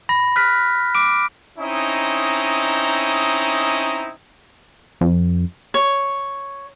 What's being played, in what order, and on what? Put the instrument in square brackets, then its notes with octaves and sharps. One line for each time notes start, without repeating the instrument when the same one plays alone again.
[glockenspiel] B5 A#6
F6 F#6 B6
D6 D7
[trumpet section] C4 C#4 D#4 E4 D#5 A#5
[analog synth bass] F2
[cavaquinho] C#5